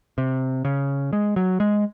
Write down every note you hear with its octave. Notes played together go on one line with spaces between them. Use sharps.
C3
C#3
G#3
F#3
G#3